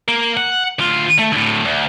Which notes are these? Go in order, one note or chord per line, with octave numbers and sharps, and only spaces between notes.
A#3
F#5
D2 F4
A3
D2 A2
D2